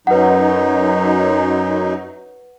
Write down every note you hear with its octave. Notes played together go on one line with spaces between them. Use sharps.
F#2 F#3 D#4 B4 F#5